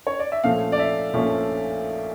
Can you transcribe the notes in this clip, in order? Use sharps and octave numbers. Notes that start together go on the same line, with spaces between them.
C#5
D5
E5
A#1 A#2 F3 A3 C#4 F5
D5
E5
A#1 A#2 F3 A3 C#4